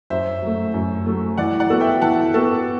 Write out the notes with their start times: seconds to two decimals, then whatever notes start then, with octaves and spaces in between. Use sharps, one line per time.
0.10 F#2 C5 E5
0.42 F#3 A3
0.74 F#2
1.06 F#3 A3
1.38 E3 D5 F#5
1.60 D5 F#5
1.70 B3 F#4 A4
1.81 E5 G5
2.02 E3 F#5 A5
2.34 B3 F#4 A4